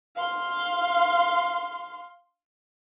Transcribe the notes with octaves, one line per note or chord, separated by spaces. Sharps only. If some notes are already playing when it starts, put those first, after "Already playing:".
F5 C6